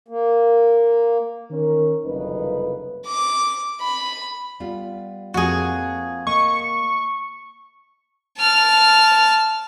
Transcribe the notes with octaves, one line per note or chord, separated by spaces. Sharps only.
A#3
D#3 C#4 A#4
F#1 C2 F2 D#4 B4
D6
B5
G3 B3 F4
F2 A#2 F#4 G#4
A#3 D#5 C#6
A5 F6